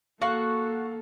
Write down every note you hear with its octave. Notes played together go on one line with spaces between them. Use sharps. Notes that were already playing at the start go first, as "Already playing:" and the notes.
A#3 F#4 A4 F5 C#6